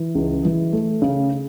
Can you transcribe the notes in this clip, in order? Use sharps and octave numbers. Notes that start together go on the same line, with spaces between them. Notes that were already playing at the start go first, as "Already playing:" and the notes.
Already playing: E3
C#2
E3
A3
C#3